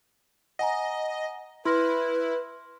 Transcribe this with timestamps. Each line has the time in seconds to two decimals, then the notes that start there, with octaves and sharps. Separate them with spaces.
0.59 D#5 F#5 G#5 A#5
1.65 E4 B4 C6 F6 A#6